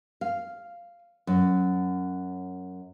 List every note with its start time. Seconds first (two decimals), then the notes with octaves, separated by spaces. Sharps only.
0.21 F5
1.27 F#2